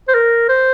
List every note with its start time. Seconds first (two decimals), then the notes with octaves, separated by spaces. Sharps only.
0.08 C5
0.14 A#4
0.49 C5